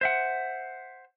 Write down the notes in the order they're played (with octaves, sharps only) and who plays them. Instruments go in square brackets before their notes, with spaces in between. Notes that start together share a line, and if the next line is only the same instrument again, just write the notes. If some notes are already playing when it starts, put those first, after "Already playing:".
[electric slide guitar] C5 E5 F#5